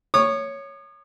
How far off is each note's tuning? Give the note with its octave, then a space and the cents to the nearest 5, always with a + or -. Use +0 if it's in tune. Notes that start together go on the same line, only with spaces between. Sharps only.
C#5 +0 D#6 -40